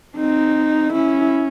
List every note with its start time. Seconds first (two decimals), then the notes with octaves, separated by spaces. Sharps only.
0.16 C4 D#4
0.93 C#4 E4